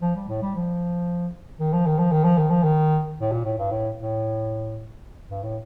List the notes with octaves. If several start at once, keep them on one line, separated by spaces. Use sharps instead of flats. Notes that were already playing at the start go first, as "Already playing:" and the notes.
F3
G3
A2
G3
F3
D#3
F3
D#3
F3
D#3
F3
D#3
F3
D#3
A2
A#2
A2
G2
A2
A2
G2
A2